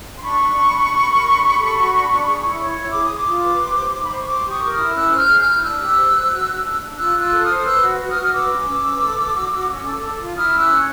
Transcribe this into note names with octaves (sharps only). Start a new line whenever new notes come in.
C6
D4 B5 C#6
D4
D4
D4
G4
A#4
D4
G4
A4
F#4
D4
D4
G#4
E4
C#5
E4
G#4 D6
G#4 D#6
C6 D6
F4
B4
G4
C5
D#4
B5
C5 C6
C#6
G4 C6 D6
G4 C#6 D#6
A#4
D#6 F6
E4
C#4 E6 F#6
C5 F#6
F6 G6
G#4
F6 G6
E4
G6
D4 E6 F#6
G4
C5
C5
F#4
F#4
D4
D4
F4 E6 F#6
F4
E6 F#6
A4
C5 D#6 F6
B4 E6 F#6
F#4
F#4
D#6 F6
F#4
F6
B4 D6 E6
C#4
C#4
B4
A4
A4
F#4
F#4
C#4
A4
A4
F4
E4 D#6 F6
C#4
E6 F#6
C#5